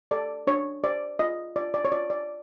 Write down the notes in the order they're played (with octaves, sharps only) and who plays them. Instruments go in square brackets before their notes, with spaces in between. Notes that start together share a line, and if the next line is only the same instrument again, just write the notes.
[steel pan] A4 D5
D4 C#5
C5 D5
F4 D#5
F4 D5
D5
C#5
F4 D5
D5